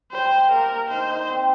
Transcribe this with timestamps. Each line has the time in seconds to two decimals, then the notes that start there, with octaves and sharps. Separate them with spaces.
0.12 G3 C5
0.51 A#3 A#4
0.90 D#4 C5
1.09 D#4
1.30 C4